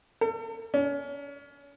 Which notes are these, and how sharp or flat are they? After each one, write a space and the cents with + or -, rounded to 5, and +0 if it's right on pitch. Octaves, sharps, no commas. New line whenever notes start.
A4 +45
C#4 +35